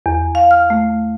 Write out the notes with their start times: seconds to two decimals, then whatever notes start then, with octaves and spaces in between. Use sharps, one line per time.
0.06 E2
0.35 F5
0.51 F6
0.70 A3